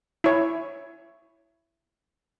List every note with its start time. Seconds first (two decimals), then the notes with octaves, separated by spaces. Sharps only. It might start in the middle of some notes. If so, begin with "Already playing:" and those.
0.24 E4 C#5